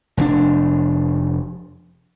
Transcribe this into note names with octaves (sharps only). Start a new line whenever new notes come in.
F1 C3 D4